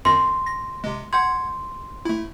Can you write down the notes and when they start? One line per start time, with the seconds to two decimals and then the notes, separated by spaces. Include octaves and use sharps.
0.05 G#1 F#2 C6 A#6
0.47 A#6
0.84 C3 G#3
1.13 F#5 C6 G6 G#6
2.05 A3 E4